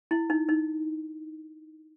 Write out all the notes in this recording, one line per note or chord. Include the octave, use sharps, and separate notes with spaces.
E4
D#4
D#4